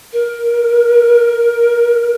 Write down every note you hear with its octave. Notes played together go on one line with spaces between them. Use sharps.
A#4